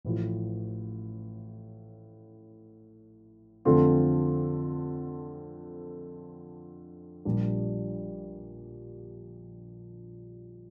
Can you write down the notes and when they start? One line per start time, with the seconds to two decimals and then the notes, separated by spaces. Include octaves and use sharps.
0.05 A1 A2 F3
3.65 F2 D3 A3 C4 F4
7.25 A#1 A#2 G3 D4